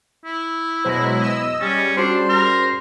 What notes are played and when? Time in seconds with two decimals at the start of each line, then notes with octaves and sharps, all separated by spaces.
0.25 E4
0.85 B2 F#3 G#3 C5 B5 A#6
1.19 B3 D#5 E6
1.61 G3 C#4 G#4 F6 A6
1.97 C#4 D4 F#4 G#4 C5
2.29 A#4